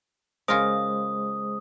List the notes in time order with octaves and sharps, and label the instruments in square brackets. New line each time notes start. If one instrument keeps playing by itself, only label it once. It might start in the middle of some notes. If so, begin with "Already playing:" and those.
[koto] C#3 F4 A#4 [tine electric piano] G#3 G#4 C5 [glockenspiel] D#6